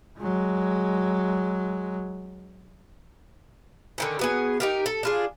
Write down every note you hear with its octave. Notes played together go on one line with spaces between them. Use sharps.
F#3 G#3
D3 D#3 C#4
F#3 B3 G#4
D#4 G4 A#4
A4
D4 F4 G#4